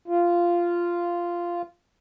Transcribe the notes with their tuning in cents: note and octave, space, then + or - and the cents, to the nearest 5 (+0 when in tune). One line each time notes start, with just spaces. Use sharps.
F4 -10